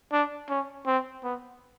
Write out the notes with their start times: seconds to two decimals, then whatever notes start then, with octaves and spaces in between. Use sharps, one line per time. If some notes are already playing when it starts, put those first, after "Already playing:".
0.12 D4
0.49 C#4
0.86 C4
1.23 B3